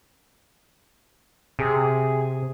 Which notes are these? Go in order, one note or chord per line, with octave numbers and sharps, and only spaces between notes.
C3 G#4